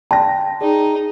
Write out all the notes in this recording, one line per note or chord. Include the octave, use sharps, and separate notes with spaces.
D5 G5 A5 C6 A#6
D#4 G#4 D5